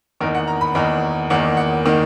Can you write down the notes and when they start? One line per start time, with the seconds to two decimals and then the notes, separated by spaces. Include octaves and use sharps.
0.21 E2 D#3 A#3 D#4 A#4
0.34 F#5
0.47 A#5
0.61 B5
0.75 E2 D#3 A#3 D#4 A#5
1.30 E2 D#3 A#3 D#4 F#5
1.57 F#5
1.86 D#3 A#3 D#4